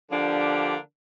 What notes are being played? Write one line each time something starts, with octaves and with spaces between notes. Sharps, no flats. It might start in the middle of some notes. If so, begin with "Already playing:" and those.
D3 F3 A#3 D4 G4